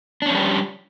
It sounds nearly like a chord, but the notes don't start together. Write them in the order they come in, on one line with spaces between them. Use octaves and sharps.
D4 C#4 F3 G3